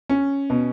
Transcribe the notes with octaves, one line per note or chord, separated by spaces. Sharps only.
C#4
B2